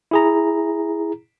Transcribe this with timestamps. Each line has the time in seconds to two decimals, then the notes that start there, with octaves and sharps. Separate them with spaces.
0.11 E4 G#4 A#5